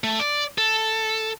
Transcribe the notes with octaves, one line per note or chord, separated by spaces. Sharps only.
A3
D5
A4